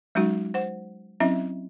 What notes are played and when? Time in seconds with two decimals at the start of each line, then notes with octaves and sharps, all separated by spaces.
0.15 F#3 G#3 C#4 D#4 F#4
0.54 C5 F#5
1.20 F#3 C4 C#4 E4 D#5 E5